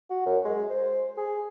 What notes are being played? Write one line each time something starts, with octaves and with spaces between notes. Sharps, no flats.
F#4
F#2
G#3
C5
G#4